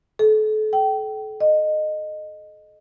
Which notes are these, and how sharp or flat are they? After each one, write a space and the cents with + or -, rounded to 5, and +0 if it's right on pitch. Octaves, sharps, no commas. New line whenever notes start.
A4 -35
G5 -25
D#5 -15